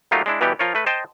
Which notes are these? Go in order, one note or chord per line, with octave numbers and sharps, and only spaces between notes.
F#3 A3 A#3 D#4 F4 G4
G#3 D4 E4
B2 E3 G3 B3 G4
F3 F4 A#4 C#5
A3 B4
C5 D#5 G5 A5